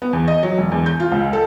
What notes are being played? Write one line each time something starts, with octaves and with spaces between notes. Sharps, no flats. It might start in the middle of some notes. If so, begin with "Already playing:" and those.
B3
E2
D#5
F#3
E1
E2
G6
F4
C#2
A4